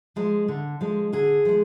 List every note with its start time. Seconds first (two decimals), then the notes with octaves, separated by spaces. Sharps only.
0.16 F3 G#3
0.48 D3
0.81 F3 G#3
1.13 D3 G#4
1.45 F3 G#3